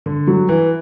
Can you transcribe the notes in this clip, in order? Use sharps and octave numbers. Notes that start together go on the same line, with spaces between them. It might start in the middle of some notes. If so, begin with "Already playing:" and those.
D3
F#3
E3